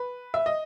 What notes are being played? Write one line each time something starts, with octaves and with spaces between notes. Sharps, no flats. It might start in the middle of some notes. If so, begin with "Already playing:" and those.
Already playing: B4
E5
D#5